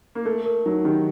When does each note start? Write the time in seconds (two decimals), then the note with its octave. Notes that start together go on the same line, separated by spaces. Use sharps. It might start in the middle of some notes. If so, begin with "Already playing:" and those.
0.15 A#3
0.25 A3 A#4
0.46 A#4
0.66 F#3 D#4
0.85 D#3 G4